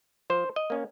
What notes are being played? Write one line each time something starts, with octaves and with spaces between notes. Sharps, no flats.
F3 C5
D#5
A#3 C#4